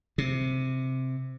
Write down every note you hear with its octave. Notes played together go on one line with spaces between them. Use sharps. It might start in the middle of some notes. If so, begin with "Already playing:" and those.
C3